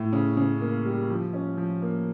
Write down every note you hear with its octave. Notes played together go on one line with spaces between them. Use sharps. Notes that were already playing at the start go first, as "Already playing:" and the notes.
Already playing: A2
C#3
C#3
A#3
G3
F3
C#4
F3
A#3